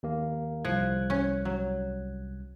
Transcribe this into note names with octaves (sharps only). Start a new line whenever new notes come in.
D#2 A#3
C2 F3 F#6 G#6
C#4
F#3